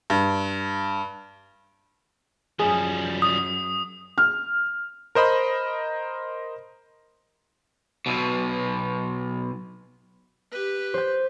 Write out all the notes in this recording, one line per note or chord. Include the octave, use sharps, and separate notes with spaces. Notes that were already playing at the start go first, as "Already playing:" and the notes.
G2
F#2 F3 G3 G#4
D#6
F6
A#4 C5 D#5 B5
B1 B2
G4 B4
C5 G6